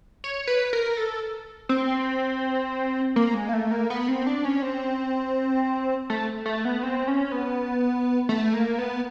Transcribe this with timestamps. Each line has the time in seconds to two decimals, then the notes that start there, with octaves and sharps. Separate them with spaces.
0.24 C#5
0.47 B4
0.73 A#4
0.97 A4
1.69 C4
3.16 A#3
3.34 G#3
3.49 A#3
3.53 A3
3.71 A#3
3.90 B3
4.08 C4
4.27 D4
4.45 C#4
4.62 C4
6.10 A3
6.46 A3
6.65 B3
6.83 C4
7.08 C#4
7.32 B3
8.29 A3
8.53 A#3
8.78 B3